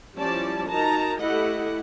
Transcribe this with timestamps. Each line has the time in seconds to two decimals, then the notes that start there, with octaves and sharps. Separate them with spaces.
0.18 F3 G3 C#4 E4 D5 A5
0.69 D#4 F#4 A#4 A5 A#5
1.21 A3 E4 G4 A4 D#5 F#5